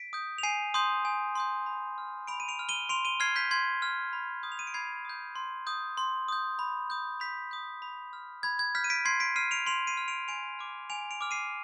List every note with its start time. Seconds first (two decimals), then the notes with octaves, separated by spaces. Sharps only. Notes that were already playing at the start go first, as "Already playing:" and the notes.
Already playing: B6 D7
0.13 D#6 G6
0.38 F7
0.43 G#5 C7 D#7
0.74 C6 D#6 G6
1.05 G#5
1.35 C6 D#6 G6
1.66 B5
1.98 F6
2.27 B5 D7 F7
2.40 D#7
2.48 D7 F7
2.59 F6
2.69 D#7 G7
2.89 C6 D7 F7
3.05 D#7 G7
3.20 F6 G#6 C7
3.36 G6 B6
3.51 C6 G#6
3.82 F6
4.13 B5
4.43 D#6 G6
4.52 F7
4.59 D#7
4.67 D7
4.74 B5 G#6 C7
5.05 D#6 G6
5.36 C6
5.67 D#6 G6
5.98 C6
6.28 D#6 G6
6.59 B5
6.90 D#6 G6
7.20 B5 G6 B6
7.51 D#6 G6
7.82 B5
8.13 F6
8.43 B5 G#6
8.59 G#6
8.75 F6 G6 B6
8.84 D#7
8.90 B6 D7
9.05 C6 G#6 C7
9.20 B6 D7
9.36 F6 C7 D#7
9.51 D7 F7
9.66 C6 D7 F7
9.87 C7 D#7
9.97 F6
10.08 D7 F7
10.28 G#5 D7 F7
10.59 D6 F6
10.90 G#5 D7 F7
11.11 D7 F7
11.21 D6 F6
11.31 C7 D#7